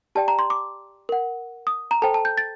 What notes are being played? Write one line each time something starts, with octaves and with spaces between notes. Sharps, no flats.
G4 D5 G5 A5
A#5
C6
D6
A#4 F#5
D#6
A#5
A4 C5 G5 A5
A5
G6
A6